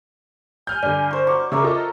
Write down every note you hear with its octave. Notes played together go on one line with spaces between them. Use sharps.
G#5 F6 G6
G2 D3 D5
C5 C#6
F#3 C#6 D6
C#3 A#4 C#5 E5
F4 A4 D#5